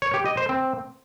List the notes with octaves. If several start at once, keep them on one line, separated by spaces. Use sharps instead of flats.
C#5
G4
D#5
C5
C4